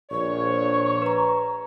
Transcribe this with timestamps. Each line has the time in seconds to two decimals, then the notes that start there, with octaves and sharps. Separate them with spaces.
0.11 A#1 A#2 C#5 C#6
1.02 B4 A#5